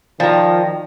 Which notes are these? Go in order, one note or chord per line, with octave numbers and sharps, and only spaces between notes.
D#3 F3 D5 F5 G5 A#5